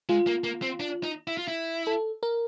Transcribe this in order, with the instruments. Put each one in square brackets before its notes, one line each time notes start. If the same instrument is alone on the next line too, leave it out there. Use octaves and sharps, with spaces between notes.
[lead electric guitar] G#3 [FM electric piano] F4
[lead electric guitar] A#3
A#3
C4
D4
D#4
E4
F4
E4
[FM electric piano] A4
A#4